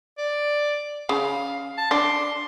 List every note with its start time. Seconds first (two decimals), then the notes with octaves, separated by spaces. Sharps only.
0.18 D5
1.09 C#3 F5
1.78 A5
1.91 D4 C6